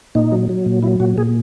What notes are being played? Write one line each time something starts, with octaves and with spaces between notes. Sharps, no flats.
A#2 D#4
F#3
F#3
A#2
F#3 E4
A#2 F#4
A#2 G#4